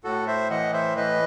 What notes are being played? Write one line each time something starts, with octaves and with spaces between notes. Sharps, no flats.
A2 F#4 A4
C5 E5
E3 D#5 F#5
C5 E5
E3 B4 D#5